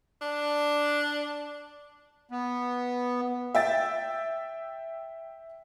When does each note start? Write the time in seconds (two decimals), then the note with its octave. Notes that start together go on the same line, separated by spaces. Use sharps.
0.22 D4
2.31 B3
3.55 E5 G5 A6